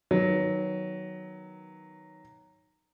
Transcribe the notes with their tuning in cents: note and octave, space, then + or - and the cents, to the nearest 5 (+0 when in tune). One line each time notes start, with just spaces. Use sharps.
D#3 +0 F#3 +5 B3 +0